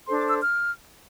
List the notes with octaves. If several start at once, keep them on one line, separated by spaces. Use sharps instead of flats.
D4 A4 C5 C6
D6
E6
F6